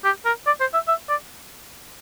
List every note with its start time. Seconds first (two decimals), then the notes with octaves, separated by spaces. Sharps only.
0.05 G4
0.26 A#4
0.47 D5
0.61 C5
0.74 E5
0.88 E5
1.09 D5